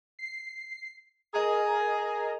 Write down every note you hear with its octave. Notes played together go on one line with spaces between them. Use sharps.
C7
G#4 A#4 D#5 A#5